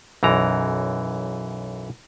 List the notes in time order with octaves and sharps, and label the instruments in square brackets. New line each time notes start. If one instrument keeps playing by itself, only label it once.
[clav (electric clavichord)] B1 F#2 E3 A#5